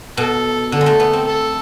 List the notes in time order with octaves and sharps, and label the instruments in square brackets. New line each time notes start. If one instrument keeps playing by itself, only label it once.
[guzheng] B2 [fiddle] A4
[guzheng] D3 [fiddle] A4
[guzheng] G#3
A3
B3
C4
[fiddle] A4